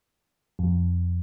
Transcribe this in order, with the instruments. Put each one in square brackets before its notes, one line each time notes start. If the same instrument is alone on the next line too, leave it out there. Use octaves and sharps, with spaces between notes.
[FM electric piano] F2